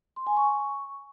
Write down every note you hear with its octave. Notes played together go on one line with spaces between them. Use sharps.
C6
G#5
C#6